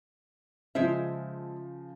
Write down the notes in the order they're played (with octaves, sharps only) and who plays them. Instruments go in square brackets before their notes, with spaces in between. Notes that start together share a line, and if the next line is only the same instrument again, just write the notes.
[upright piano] C#3 F3 [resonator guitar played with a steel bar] G#3 C5 E5